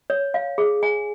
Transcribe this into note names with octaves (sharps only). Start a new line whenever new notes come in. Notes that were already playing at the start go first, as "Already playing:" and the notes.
C#5
F5
G#4
G#5